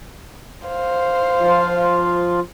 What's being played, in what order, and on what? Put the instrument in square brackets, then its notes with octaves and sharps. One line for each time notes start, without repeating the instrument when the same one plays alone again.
[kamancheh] C5 F5
[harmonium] F3 F4